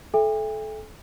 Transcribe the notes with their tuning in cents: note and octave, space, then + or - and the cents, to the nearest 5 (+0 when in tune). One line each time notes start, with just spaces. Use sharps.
A4 -30 E5 +0 G5 +45